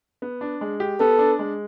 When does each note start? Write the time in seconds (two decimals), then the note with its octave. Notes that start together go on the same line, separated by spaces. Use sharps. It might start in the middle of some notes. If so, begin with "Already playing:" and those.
0.22 B3
0.41 D4
0.61 G#3
0.80 G4
1.00 B3 A4
1.19 D4
1.39 G#3